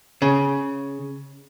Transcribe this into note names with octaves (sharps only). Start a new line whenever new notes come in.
C#3